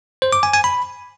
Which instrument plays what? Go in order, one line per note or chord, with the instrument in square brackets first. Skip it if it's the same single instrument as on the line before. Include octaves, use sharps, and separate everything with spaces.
[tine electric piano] C5
D6
G#5
G#5
B5